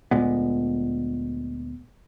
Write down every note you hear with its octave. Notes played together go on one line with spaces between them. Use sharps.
D2 A#2 G#3 B3